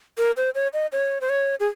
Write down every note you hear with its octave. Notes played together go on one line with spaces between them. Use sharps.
A#4
C5
C#5
D#5
C#5
C5
C#5
G#4